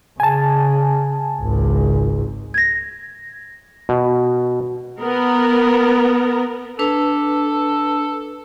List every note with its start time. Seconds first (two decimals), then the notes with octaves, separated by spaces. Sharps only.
0.20 C#3 G#5 A5
1.41 G#1 C#2
2.54 G#6 A#6
3.89 B2
5.00 B3 A#4
6.79 D4 A4 B4